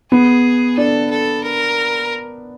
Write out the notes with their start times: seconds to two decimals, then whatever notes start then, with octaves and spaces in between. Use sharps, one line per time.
0.11 B3 G#4
0.77 D4 A4
1.10 A4
1.43 A#4